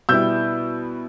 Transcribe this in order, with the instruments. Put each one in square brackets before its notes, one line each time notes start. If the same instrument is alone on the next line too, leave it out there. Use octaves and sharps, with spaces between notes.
[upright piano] B2 G3 B3 E4 E6 G6